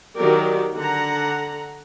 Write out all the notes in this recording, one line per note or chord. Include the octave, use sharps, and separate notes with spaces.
D#3 F#3 G4 A#4 D5
D3 F#5 A#5